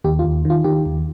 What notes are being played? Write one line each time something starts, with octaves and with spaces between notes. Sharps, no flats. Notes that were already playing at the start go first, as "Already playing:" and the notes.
D#2 G4
F4
D#2
D#3 F4
D#3 G4
D#2